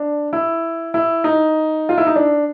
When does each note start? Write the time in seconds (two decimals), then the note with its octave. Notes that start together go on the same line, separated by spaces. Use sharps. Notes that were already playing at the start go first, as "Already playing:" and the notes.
Already playing: D4
0.33 E4
0.94 E4
1.24 D#4
1.89 F4
1.98 E4
2.07 D#4
2.16 D4